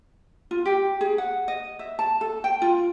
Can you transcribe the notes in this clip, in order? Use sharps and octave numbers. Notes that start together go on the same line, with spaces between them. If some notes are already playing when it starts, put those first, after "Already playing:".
F4
G4
G#4
F#5
D#5
E5
A5
A4
G5
F4